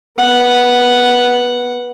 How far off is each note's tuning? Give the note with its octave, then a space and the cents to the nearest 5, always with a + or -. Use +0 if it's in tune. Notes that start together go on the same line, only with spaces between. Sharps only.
B3 -15 F#5 +0